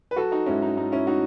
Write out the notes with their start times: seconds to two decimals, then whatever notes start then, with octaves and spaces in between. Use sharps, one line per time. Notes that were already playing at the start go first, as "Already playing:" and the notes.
0.11 B4
0.16 F#3 F#4 A4
0.32 D#4 F#4
0.46 G#2 C#4 E4
0.62 D#4
0.77 G#2 D#4
0.92 C#4 E4
1.07 A3 D#4 F#4